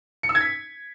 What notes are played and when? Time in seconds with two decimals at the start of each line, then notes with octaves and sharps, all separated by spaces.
0.23 C#7
0.29 E6
0.35 G#6
0.41 B6